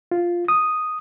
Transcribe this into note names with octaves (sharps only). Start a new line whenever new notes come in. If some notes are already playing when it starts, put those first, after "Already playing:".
F4
D#6